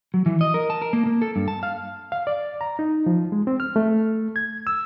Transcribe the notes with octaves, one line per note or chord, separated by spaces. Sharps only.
F#3
E3
D#5
A#4
A5
A#4
A#3
A#3
A4
G2
A5
F5
F5
D5
A#5
D#4
F3
G#3
C4
F6
A3
G#6
E6